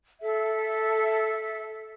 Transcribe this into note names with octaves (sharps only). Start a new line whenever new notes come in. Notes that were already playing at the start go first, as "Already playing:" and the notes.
A4 E5